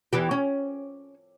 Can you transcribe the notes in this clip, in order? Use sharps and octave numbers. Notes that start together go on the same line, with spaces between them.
E2 E3 G4
C#4